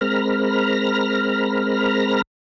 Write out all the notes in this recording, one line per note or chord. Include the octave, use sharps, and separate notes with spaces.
G#3 C4 A#4 B5 F6 A#6